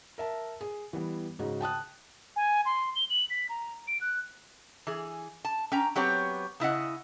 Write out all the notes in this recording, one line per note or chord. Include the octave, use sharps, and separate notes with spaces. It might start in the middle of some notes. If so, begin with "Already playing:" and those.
A#4 E5 A5
G#4
E3 G3 B3
G#2 C#3 D#4 F#4
G5 A5 D#6 F#6
G#5
C6
G7
F#7
B6
A#5
D7
F#6
E3 G#4
A5
C#4 G5 A#5
F#3 B3 C4 G4 C#5
C#3 E4 D#5 F#5